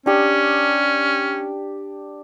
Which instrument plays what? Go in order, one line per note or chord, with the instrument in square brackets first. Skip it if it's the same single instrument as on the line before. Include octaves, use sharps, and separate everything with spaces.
[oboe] C#4 [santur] D4 G4